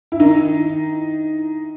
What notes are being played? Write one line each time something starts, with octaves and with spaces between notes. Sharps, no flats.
E4
D#3 D#4